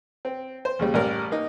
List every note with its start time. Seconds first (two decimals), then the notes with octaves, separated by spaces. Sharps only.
0.25 C4
0.65 C5
0.79 D#2 C#3 G3
0.94 A1 G3 A#4 D5
1.32 A#3 D#4